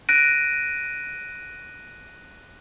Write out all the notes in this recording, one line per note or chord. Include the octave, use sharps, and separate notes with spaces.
F#6 A#6 D7 D#7